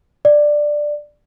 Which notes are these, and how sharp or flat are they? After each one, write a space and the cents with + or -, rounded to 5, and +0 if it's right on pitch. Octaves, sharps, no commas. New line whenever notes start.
D5 +10